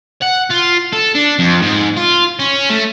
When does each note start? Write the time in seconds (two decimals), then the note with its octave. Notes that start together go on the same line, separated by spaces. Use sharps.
0.22 F#5
0.50 F4
0.93 A4
1.15 D4
1.39 F2
1.62 G#2
1.97 F4
2.39 C#4
2.70 A3